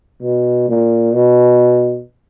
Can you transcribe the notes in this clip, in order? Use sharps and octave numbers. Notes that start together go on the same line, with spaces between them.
B2
A#2
B2